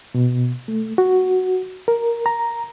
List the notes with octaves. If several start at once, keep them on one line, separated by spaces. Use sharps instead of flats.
B2
A3
F#4
A#4
A#5